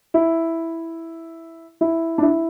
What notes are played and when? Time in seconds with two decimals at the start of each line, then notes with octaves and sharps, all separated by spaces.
0.14 E4
1.81 E4
2.18 D4
2.22 E4